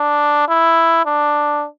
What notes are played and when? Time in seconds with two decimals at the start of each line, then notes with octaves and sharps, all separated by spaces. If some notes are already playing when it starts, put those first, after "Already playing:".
Already playing: D4
0.48 E4
1.06 D4